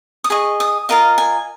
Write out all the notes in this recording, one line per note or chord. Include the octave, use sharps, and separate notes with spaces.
D#6
G#4 D#5 C#6
D#6
F4 A#4 D#5 F5
G#5